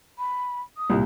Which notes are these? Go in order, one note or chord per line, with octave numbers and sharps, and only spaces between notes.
B5
D#6
C2 A#2